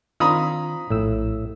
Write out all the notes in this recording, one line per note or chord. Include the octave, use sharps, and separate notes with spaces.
D#3 C4 D4 F4 A#5 B5 D#6
A#1 A2 E6